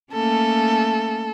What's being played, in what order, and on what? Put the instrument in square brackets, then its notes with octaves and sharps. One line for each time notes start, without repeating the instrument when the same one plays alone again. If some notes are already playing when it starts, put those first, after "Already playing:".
[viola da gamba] A3 A#3 C#4 [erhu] A4